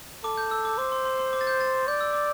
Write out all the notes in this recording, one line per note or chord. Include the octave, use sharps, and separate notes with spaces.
A4 D6
G6
E6
D6
C5 D6
C6
C6
C6
D6
A6
G6
A6
D5 G6
E6
D6